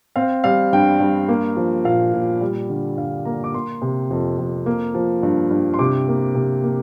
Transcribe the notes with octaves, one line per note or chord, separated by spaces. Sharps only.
C4 F5
G3 F5
G2 G5
G2
A#3
F3
A#2 F5
A#2
G3
D3
G2 F5
A#3 A#5
D6
A#3 C6
C3
F2
F2
A#3
F3
G2
G2
C6
C3 D6
A#3
C3
A#3